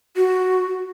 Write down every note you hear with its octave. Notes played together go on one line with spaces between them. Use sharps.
F#4